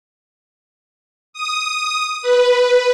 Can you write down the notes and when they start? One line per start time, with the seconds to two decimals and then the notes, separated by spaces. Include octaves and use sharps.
1.33 D#6
2.22 B4